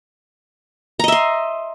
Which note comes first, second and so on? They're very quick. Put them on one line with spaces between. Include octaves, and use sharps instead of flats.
A#5 D#5 E5 C6